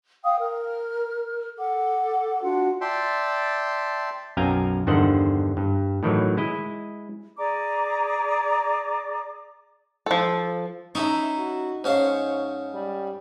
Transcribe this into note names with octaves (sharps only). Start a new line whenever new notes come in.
F5 G5 D#6
A#4 F6
A4 F#5 D6
D4 F4 F#4 F#5
D5 E5 G5 A5 C6
B1 F#2 F5 G5 G#5 A#5
E2 G2 D3 D#3 C5 F#5
G2
A2 D#3 E3 F#3
G#3 E4 D#5
G#4 D5 A#5 D6
F3 A4
C#4 D#4 E4 E5 A5 A#5 C#6
F#4
G#2 C#4 C5 C#5 F5 A5
G3